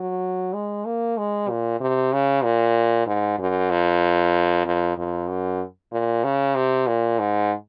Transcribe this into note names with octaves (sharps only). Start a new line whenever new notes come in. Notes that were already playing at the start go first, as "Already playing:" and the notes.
Already playing: F#3
G#3
A#3
G#3
A#2
C3
C#3
A#2
G#2
F#2
F2
F2
F2
F#2
A#2
C#3
C3
A#2
G#2